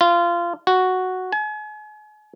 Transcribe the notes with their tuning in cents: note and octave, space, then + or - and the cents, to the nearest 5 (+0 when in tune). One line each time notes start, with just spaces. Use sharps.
F4 -20
F#4 +0
G#5 +40